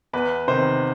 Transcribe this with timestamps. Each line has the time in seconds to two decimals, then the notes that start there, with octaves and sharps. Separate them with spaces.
0.13 E2 B4
0.48 C3 D#3 C5